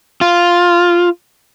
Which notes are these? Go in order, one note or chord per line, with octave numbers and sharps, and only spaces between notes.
F4